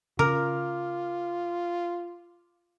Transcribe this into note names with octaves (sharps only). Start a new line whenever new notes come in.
C#3 F4 A#4 D6 F6